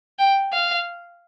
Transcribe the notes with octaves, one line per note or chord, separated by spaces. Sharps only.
G5
F5